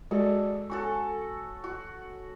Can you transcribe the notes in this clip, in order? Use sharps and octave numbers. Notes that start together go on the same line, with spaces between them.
G#3 F#4 G#4 A4 D5
C#4 F#4 A4 C#6
F#4